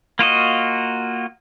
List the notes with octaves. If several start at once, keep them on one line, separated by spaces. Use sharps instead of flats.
A#3 F4 F#4 D#5